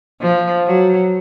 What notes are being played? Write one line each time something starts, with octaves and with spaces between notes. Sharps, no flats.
F3
F#3